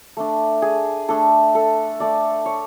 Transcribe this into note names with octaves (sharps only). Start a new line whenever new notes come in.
A3 D4
G#4
A3 D4 A4
A4
A3 D4 D5
C#5